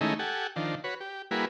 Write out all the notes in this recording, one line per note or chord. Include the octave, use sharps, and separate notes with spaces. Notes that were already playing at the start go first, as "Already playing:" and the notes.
D#3 G#3 A3 C#4 D#4 E4
G4 A4 F#5 G#5
D#3 F3 D4
F#4 B4 C#5
G4
G3 A#3 E4 F#4 G#4 B4